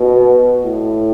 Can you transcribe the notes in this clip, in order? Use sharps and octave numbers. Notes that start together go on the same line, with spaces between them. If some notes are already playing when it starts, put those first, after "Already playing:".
Already playing: B2
A2